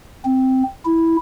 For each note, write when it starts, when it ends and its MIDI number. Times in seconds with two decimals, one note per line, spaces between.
0.25 0.63 60
0.85 1.17 64